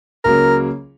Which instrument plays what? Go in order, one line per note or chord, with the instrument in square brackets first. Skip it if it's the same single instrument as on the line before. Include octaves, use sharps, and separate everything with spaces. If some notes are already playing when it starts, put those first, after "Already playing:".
[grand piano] C#2 C#3 F#3 A#3 C#4 [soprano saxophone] A#4